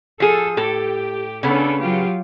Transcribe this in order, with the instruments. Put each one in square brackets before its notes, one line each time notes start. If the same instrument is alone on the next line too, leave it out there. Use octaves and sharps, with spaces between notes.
[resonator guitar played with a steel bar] F3 G#4 [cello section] A4
[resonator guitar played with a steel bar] A2 A4 [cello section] G4
[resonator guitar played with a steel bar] C#3 B3 [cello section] C#4 D4 A4
[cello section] F#3 F4 G4